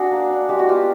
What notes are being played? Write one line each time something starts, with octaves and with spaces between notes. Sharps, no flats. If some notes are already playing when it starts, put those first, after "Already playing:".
Already playing: D4 F#4 G#4
A#3
D4
G#3 G4
F#4
B3 F4 G4